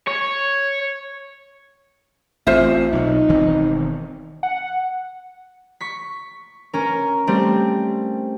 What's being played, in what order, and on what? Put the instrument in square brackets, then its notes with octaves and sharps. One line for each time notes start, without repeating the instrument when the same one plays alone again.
[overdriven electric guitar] C#5
[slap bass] A1 C4 [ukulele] F4 C5 E5
[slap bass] B1 F#3 [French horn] D#4
[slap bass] E1 D#3 C4
[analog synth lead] F#5
[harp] C#6 B6
C#4 A#4
G3 A3 C4